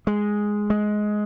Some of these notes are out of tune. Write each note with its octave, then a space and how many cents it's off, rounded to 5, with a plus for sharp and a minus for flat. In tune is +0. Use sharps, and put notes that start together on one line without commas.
G#3 +0
G#3 +15